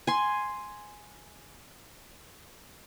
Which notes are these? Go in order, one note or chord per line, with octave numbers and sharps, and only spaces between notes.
G#5 C6